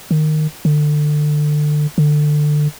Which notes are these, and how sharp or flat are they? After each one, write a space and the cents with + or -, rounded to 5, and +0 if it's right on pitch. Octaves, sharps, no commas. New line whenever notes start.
D#3 -15
D3 +25
D3 +20